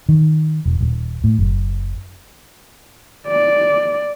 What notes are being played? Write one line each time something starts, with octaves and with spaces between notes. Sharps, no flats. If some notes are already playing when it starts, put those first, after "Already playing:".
D#3
E1
D#1
A2
F#1
D5